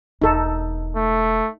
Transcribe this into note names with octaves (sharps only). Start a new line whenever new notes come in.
E1 D#4 A4
A3